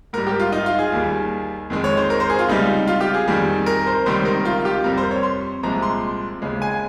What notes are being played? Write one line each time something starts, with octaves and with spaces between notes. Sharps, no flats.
G#2 G3 A#4
G4
F4
D#4
F4
G#4
D#2 D#3 G3
F2 D#3 G#3
C#5
C5
A#4
C5
G#4
F4
C#2 C3 G3 D#4
F4
G4
G#4
F2 D#3 G3
A#4
C5
C#2 C3 D#3 G3 C5
A#4
F4
G4
F2 C3 G3 A#4
C5
C#5
C6
C2 A#2 F3 G#3 A#5
C6
D#2 C#3 G#3
G#5